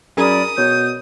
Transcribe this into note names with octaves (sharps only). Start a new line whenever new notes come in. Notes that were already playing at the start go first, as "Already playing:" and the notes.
F#2 G#4 A#4 D5 G#5 B5 D#6
B2 C#5 G6